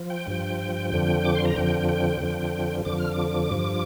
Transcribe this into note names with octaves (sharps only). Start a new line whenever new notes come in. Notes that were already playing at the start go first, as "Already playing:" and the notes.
Already playing: F3
G5
G2 F3
F2 D3 F3
D6
C6
A#5
F2 D3 F3 G5
G5
F2 D3 F3
F2 D3 F3 D6
F6
D6
G2 F3